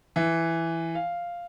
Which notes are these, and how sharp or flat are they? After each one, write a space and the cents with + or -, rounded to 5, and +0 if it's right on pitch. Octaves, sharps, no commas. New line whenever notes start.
E3 +5
F5 -5